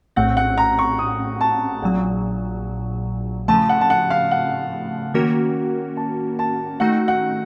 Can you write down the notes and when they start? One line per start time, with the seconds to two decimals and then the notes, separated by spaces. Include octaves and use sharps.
0.16 A#1 A2 A3 C4 F#5
0.37 F#5
0.58 A#5
0.79 C#6
0.99 D#6
1.41 A5
1.82 A#1 A#2 F#3 F#5
3.48 C#3 F3 A3 A5
3.69 F#5
3.81 A5
3.90 F#5
4.10 F5
4.31 F#5
5.14 D#3 A#3 C#4 F#4 A#4
5.97 A5
6.39 A5
6.80 D#3 A3 D#4 F#4 F#5
7.08 F#5